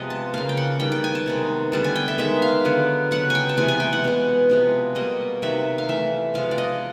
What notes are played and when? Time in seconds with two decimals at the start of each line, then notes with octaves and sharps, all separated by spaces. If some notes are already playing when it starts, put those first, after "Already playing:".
Already playing: C3 F3 G#3 B3 D#5
0.10 A5
0.34 C#3 F3 A#3 F5
0.49 G5
0.57 F#5
0.80 D#3 G3 B3 G5
0.92 G5
1.04 G#5
1.15 A5
1.26 C3 D#3 G#3 B3
1.72 D3 G3 B3 A5
1.84 G#5
1.96 G5
2.08 E5
2.18 D#3 G#3 B3 E5
2.42 F5
2.65 D3 F#3 B3
3.11 C#3 F#3 B3 F#5
3.30 G5 G#5
3.49 A5
3.57 C3 E3 G#3 B3 G#5
3.68 G#5
3.80 G5
3.93 F#5
4.04 B2 G#3 B3
4.50 C3 F3 G#3 B3
4.95 B2 G3 A#3 D#5
5.42 C3 D#3 F#3 B3 E5
5.78 F5
5.88 E3 A3 E5
6.34 C3 F3 G#3 B3 F5
6.51 D5
6.58 D#5